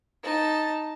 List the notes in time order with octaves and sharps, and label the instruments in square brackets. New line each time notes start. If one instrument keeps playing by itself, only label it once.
[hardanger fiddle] D#4 A5